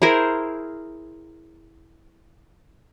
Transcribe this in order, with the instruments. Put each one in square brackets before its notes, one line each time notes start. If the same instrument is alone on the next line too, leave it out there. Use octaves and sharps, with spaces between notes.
[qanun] E4 G#4 A#4 C5